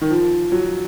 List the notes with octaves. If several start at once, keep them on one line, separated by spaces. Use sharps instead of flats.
D#3
F3
F#3